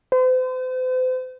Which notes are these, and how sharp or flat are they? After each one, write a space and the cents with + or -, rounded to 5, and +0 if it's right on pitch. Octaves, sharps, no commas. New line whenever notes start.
C5 -40